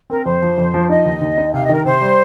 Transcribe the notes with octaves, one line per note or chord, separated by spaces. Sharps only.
C4 A#4
F2 C5
F3
F2
F3
D#4 D#5
D#2
D#2
D#4
C3 F5
D#3 D#5
A#4
C3 C5
G3